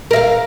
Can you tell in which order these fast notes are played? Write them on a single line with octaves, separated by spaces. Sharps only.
A#4 E5 F5